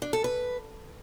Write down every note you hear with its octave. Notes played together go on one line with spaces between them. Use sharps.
D4
A4
B4